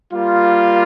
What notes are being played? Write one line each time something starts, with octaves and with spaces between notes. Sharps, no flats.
G3 A#3 F4